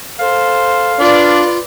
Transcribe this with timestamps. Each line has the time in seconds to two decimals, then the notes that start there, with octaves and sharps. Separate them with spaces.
0.19 A4 C5 F5
1.00 D4 F4 B4 D5